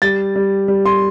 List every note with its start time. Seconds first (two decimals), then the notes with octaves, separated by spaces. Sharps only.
0.02 G3 A6
0.36 G3
0.68 G3
0.86 C6